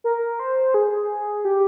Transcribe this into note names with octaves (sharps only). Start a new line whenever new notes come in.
A#4
C5
G#4
G4